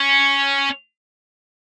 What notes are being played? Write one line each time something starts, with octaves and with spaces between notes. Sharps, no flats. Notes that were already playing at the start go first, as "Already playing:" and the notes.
Already playing: C#4